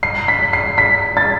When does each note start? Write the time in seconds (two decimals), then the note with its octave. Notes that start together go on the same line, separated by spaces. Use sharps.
0.03 C7
0.28 B6
0.53 C7
0.78 B6
1.17 A6